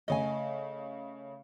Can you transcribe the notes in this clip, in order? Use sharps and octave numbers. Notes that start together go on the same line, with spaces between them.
C#3 A3 D#5 G#5